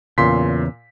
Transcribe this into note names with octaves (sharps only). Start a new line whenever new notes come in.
E2 A#2 C#3 C6 B6